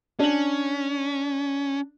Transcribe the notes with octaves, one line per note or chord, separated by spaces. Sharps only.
C#4 D4 F#7